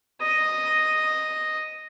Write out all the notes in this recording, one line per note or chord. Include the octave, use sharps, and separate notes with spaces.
D#5